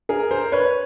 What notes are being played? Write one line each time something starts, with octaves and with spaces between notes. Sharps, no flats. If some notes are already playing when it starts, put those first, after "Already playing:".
G#4 A#4
A#4 C5
B4 C#5